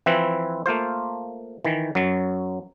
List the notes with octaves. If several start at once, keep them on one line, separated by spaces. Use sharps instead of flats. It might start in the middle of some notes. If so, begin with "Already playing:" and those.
E3 F3 C4 E4 B4
A3 A#3 F4 C5
D#3 E3
F#2 F#3